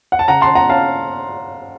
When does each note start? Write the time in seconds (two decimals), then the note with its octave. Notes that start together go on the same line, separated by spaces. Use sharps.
0.12 F#5
0.19 A5
0.28 C#3 F#5 A#5
0.41 A5 C6
0.49 C#3
0.55 F#5 A#5
0.70 C#4 F5 A5